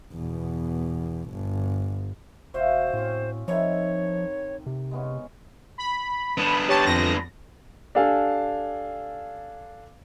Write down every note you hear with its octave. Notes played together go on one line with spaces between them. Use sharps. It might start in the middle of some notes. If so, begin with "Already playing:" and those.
E2 B2
G1
E1 F#4 C5 E5 F5
A2 C4 C#4
D#3 F3 C4 E4 C#5
C3
G#3 B3 C#4
B5
B3 D4
G4 C#5 A5
F2 A#6
D4 G4 A4 F5 G#5